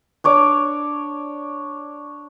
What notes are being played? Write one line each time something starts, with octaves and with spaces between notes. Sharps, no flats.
D4 C#5 D6